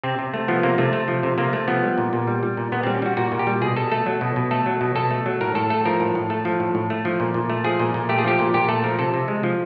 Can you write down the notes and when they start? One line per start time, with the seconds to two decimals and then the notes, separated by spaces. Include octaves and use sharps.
0.04 C3 C4
0.19 C3
0.34 A3
0.48 F3 B3
0.63 C3 A#3
0.78 C3 A3
0.93 A3
1.08 F3
1.23 C3
1.38 C3 A#3
1.53 A3
1.68 F3 B3
1.83 G3
1.98 A#2
2.13 A#2
2.27 G3
2.43 G3
2.57 A#2
2.72 A#2 B3
2.83 C4
2.87 G3
2.95 C#4
3.02 G3 F#4
3.17 A#2 F#4
3.32 A#2
3.39 G4
3.47 G3
3.62 B2 G#4
3.76 B2 A4
3.92 A3 A4
4.06 F#3
4.21 B2
4.36 B2
4.51 A3 A4
4.66 F#3
4.81 B2
4.96 B2 A4
5.11 A3
5.26 F#3
5.41 A2 A#4
5.55 A2 A4
5.70 A3 A4
5.85 F3 A#4
6.00 A2
6.15 A2
6.30 A3 A4
6.45 F3
6.60 A2
6.75 A2
6.90 A3
7.05 F3
7.20 A#2
7.34 A#2
7.50 A3
7.64 F3 G#4
7.80 A#2
7.94 A#2
8.09 A3 G4
8.18 G#4
8.24 F3 G4
8.39 A#2
8.54 A#2 G4
8.69 A3 A4
8.84 F3 A#4
8.99 C3 A4
9.14 C3
9.28 G#3
9.43 F3